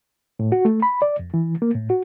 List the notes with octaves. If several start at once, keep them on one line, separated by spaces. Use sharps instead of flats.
A2
F#4
A3
B5
D5
F2
E3
A#3
A2
F#4